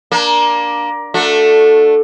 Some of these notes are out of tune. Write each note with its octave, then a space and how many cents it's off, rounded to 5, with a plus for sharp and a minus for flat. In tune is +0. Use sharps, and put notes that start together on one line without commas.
A#3 +20 D4 +0
A3 +0 D4 +10 F#4 -25